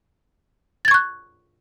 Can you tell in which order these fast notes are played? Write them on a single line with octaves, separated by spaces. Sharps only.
A6 G#6 C#6 F#6